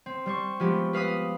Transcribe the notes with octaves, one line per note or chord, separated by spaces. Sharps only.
C4
G3 C5 C#6
F3 G#3 B3 G4
B4 F5 D#6 B6